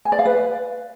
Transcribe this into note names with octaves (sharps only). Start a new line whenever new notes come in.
G#5
D5
F5
B4